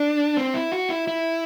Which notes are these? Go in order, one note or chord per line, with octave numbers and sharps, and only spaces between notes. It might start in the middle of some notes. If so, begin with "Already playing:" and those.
Already playing: D4
C4
E4
F#4
E4
E4